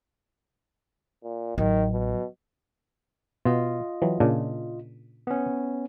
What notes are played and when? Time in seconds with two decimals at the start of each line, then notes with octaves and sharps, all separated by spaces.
1.24 A#2
1.58 A1 D#3 F#3
1.92 B2
3.45 B2 F4 D#5
4.02 E3 F#3
4.20 A#2 C#3 D4
5.27 B3 C#4